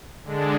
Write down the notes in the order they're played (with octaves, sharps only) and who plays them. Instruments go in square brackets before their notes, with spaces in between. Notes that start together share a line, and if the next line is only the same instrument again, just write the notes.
[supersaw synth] D3 G#3 D4